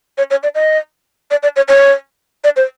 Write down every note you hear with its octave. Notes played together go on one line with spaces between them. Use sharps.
C#5
C#5
D5
D#5
D5
D5
C#5
C#5
D5
C5